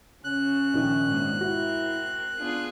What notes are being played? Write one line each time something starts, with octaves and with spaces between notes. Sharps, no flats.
C#3 C#4 F#6
A#1 D#3
G#2 B2 A#3
C4 E4 F#4 A#4
B3 D4 F4 G#4